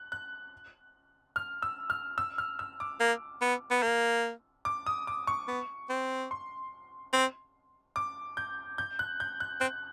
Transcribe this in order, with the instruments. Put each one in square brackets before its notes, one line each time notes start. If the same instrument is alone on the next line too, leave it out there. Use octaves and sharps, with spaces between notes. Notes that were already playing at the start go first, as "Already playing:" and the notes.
Already playing: [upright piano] F#6
F#6
F6
E6
F6
E6
F6
E6
D6
[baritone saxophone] A#3
B3
B3
A#3
[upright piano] D6
D#6
D6
C#6
[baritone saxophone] B3
C4
[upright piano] C6
[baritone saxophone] C4
[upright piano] D6
G6
G6
F#6
G6
F#6
[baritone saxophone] C4 [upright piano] F#6